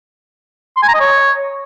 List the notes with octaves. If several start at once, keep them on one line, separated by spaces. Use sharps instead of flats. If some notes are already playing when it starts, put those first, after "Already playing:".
C6
G#5
A#5
D#5
C#5